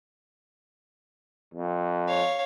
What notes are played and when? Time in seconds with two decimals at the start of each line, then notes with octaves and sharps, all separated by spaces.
1.54 F2
2.08 C#5 F5